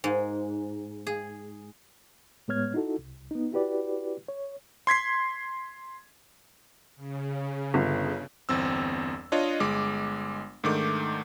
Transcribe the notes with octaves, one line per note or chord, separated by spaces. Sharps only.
G#2
G#4
A2 G#3 B3 C#5 F6 G#6
D#4 E4 F#4 A4
C2
B3 D#4
E4 F#4 G4 B4 D5
C#5
C6 G#6 B6 C7
C#3
G1
G1 E2 C4 E6
D4 F4 C#5 D#5
G1 G#3 D6
G#2 D#3 A3 D4 D6